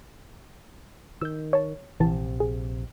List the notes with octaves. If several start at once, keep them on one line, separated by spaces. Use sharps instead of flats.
D#3 E6 G6
C#5 A5
A#1 C3 E3 A5
G#4